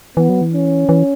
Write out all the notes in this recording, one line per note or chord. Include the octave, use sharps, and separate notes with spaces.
E3 B3
F#3
E3
C#4
E3